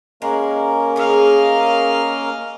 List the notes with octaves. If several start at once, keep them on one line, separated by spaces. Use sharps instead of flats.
G#3 A#3 C#4 A#4
C#3 G#4 D#5 F5